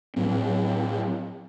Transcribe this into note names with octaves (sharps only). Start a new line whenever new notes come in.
A2 F#3 C4